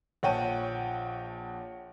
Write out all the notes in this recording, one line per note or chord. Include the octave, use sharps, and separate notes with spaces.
A#1 C#5 F#5 G5 A5 D#7